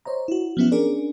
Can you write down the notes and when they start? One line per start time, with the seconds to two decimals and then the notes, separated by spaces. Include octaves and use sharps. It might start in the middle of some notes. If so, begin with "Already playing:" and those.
0.05 C5 C#5 D#5 A#5
0.28 E4 F#4
0.57 F3 F#3 B3 C#4 E4 F#4
0.72 C#4 D4 G#4 A#4 D5